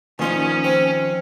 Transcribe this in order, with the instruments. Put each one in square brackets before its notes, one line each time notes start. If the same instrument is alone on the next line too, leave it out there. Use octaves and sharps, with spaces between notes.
[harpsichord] A#2 C6 [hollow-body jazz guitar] D#3 F3 D#4 [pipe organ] C#4
[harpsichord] C4